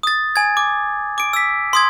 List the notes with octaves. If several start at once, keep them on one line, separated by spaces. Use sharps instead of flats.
D#6 A6
G#5 G#6
D6
D6 D7
E6 B6
C6 D#6 G#6